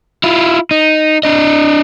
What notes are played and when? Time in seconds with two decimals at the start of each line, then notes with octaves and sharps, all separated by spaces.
0.24 E4 F4
0.71 D#4
1.23 D4 D#5